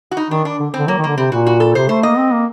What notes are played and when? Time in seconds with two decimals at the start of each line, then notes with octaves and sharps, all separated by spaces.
0.11 F#4
0.17 D#4
0.30 D#3 D4
0.45 D4
0.59 D3
0.74 C4
0.79 D3
0.88 F#3 A#3
0.98 D#3
1.04 D3 A#3
1.17 C3 C4
1.32 A#2 F#4
1.46 F#4
1.60 A4
1.75 C3 C5
1.89 A3 C5
2.03 A#3 D#5
2.18 C4
2.33 A#3